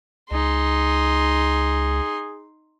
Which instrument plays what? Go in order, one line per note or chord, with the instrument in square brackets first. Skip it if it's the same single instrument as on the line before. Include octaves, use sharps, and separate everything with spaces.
[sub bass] C#2 [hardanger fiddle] D#4 C6 [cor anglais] G#4